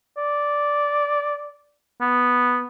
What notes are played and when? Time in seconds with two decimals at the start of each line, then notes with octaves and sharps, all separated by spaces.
0.17 D5
2.01 B3